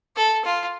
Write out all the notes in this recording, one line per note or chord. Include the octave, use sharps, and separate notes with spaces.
A4
F4